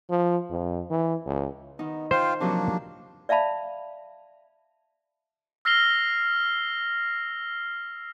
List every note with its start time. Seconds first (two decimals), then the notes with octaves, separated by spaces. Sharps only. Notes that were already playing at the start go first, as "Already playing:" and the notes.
0.10 F3
0.51 F2
0.91 E3
1.26 C#2
1.79 D#3 B3 D#4
2.11 F4 C5 F5 G5
2.40 C3 F3 F#3 A#3 D4
3.29 D5 E5 F5 A5 B5
5.65 E6 F6 A#6 C7 F7 G7